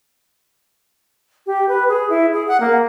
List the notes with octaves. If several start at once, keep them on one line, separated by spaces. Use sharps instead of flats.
G4
B4
G#4
E4
G#4
F#5
A#3